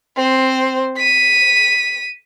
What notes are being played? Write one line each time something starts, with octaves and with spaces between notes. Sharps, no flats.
C4 C5
B6 D#7